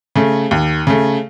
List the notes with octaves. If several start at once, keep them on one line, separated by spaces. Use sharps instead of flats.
C#3 A3
D#2
C#3 A3